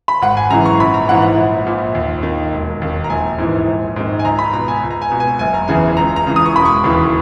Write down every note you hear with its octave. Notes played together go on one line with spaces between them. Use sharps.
B5
G#1 F#5
G#5
F#2 C#3 E3 A#5
C#6
A#1 B5
A#5
G#2 E3 F#5
F#5
A#1
A#2
D#2
D#3
E1
D#2 D#3
A#5
A#1 G#5
G#2 E3
A#1
G#2 D#3
G#5
C#2 A#5
B5
B2 A#5
G#5
C#2
A#5
G#5
B2
G#5
F#1 G#5
A#5
E2 C#3 E3 G#5
C#2 A#5
A#5
C#3 E3
D#6
C#6
E1 B5
C#6
D#2 C#3 E3